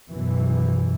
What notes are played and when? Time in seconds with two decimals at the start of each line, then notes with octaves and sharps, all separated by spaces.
0.10 F#2 B2 E3